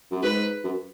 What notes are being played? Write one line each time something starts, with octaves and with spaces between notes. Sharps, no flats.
F#2
G#2 B4
F#2